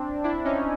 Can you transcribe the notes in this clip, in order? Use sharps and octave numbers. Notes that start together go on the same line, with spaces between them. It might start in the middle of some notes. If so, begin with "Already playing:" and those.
Already playing: C4 D4
D4 E4
C#4 D#4